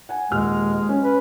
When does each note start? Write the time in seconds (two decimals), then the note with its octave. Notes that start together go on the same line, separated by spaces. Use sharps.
0.09 F#5 G#5
0.31 D#1 G#3 F6
0.89 C#4
1.04 B4